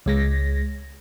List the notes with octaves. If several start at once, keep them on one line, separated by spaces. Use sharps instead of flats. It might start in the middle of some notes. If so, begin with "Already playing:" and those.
C#2 G#3 A#6